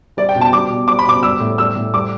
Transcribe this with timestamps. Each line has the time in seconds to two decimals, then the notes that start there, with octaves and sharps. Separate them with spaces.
0.17 G3 D5
0.29 G5
0.36 B2
0.41 A5
0.52 G3 D6
0.70 B2
0.88 G3 D6
0.99 B5
1.06 B2 D6
1.23 G3 E6
1.40 A2
1.58 G3 E6
1.76 A2
1.93 G3 D6